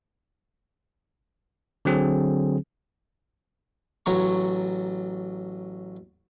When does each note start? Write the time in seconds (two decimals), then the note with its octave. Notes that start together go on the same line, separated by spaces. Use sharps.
1.85 D3 F#3 C4 G#4
4.06 A1 F#3 A#5 C#6